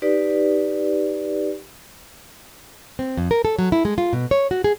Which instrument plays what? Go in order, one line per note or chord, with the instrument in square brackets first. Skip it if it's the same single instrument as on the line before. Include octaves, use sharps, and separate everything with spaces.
[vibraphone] D#4 G4 B4 D5
[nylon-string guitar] C4
F2
A#4
A4
F#3
E4
G#3
F4
B2
C#5
F#4
G#4